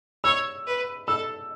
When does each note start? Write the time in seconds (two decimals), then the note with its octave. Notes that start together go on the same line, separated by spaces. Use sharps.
0.24 C#5 E6
0.66 B4
1.07 A4 E6